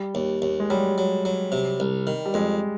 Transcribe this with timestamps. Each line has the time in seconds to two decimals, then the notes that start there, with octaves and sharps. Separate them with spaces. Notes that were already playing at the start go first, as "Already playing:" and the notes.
Already playing: G3
0.15 D#2
0.42 D#2
0.60 G#3
0.70 F#3 G3
0.98 F#3
1.25 F#3
1.52 C3
1.80 C2
2.07 D#3
2.26 G3
2.34 F2 G#3